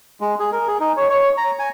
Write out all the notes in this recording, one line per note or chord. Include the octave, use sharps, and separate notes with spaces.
G#3
G#4
A#4
G#4
D#4
C#5
C#5
A#5
G#5